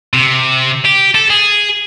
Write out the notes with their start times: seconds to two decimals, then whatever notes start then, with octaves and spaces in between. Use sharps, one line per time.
0.13 C3
0.85 G4
1.15 A4
1.30 G#4